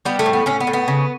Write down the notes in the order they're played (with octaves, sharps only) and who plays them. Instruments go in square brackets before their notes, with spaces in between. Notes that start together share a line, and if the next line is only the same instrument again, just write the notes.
[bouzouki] G3 B3
A3
A2
B3
A2 C#4
B3
A2
B3
C#3